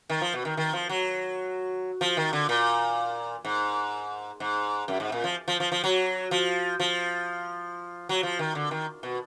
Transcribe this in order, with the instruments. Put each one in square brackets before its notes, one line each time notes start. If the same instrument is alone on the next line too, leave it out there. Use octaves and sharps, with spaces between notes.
[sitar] D#3
F3
B2
D#3
D#3
F3
F#3
F3
D#3
D3
A#2
G#2
G#2
F#2
G#2
A#2
F3
F3
F3
F3
F#3
F3
F3
F#3
F3
D#3
D3
D#3
B2